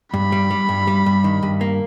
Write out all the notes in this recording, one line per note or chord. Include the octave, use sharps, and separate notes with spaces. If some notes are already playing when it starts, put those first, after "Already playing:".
G2 B5
G3
G3
G2
G3
G2
D#3
G2
A#3